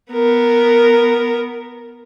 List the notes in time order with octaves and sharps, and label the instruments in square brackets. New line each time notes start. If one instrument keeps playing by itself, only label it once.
[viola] B3 A#4